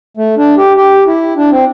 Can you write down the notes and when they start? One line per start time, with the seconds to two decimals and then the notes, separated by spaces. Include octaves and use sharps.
0.17 A3
0.37 D4
0.57 G4
0.77 G4
1.07 E4
1.37 D4
1.51 C4